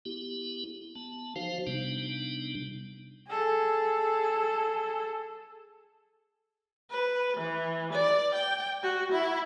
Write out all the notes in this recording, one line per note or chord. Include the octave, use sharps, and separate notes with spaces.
B3 E4 G4
B3 A5
F3 D#4 F#4 C5 F5
C3 G3 B3 D4 D#4
G#4 A4
B4
E3
D5
G5
F#4
E4